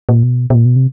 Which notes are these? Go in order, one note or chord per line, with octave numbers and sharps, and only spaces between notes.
A#2
B2
B2
A#2
B2
C3